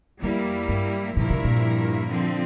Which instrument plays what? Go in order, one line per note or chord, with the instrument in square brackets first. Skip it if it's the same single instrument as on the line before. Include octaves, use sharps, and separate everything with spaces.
[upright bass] F2 [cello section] G3 A#3 E4
[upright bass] G2
[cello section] G2 F3 A#3 E4 A#4 [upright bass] A#2
[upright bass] C3
A#2
[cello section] D3 F3 C4